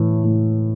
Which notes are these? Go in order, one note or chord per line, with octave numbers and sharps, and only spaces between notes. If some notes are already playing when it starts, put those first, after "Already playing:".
Already playing: A2 E3
A2